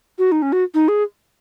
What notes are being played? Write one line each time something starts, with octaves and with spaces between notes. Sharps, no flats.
F#4
D#4
C#4
F#4
D#4
G#4